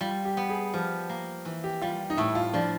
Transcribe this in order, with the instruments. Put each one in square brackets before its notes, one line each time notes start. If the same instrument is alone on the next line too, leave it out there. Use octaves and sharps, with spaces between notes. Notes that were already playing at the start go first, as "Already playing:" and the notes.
[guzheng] G3 [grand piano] F4
[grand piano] G4
[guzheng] B3
[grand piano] G#4
[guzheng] F3 [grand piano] G4
[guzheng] A#3
E3
[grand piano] G4
[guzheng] G3 [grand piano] F4
[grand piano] D#4
[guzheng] A2 [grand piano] E4
[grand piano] F4
[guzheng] F3 [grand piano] D4